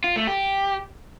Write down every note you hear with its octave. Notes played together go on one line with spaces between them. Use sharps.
F4
A3
G4